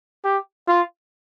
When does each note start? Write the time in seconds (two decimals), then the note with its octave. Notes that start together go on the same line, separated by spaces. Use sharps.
0.24 G4
0.68 F4